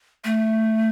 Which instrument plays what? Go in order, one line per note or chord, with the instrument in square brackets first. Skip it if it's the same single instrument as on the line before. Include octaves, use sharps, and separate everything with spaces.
[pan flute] A3